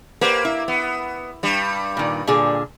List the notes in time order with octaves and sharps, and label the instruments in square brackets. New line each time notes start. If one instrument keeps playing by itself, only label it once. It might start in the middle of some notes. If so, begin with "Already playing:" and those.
[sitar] A#3 [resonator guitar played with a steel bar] G4 B4 C5
[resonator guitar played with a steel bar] E4
[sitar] B3
G2 G3
[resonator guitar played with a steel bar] A#2 D#3
A#2 D3 G#4